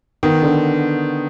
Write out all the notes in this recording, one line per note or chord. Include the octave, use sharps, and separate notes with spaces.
D#3 B3
D3